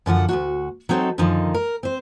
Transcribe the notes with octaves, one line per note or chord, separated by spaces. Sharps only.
F#2 D3 F3 F#5
D2 C3 F#4
F#3 C4 D#4 A4 C#5
F#2 D3 D#3 F3 D#4
A#4
C4 C5